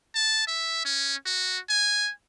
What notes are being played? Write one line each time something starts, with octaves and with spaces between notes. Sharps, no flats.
A5
E5
C#4
F#4
G#5